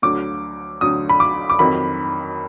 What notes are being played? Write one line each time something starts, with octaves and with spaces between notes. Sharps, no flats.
D2 D3 F#3 D6
D2 D3 F#3 D#6
B5
D6
D6
F2 D#3 F#3 B5